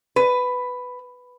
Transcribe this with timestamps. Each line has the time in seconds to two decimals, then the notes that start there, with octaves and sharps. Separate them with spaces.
0.16 B4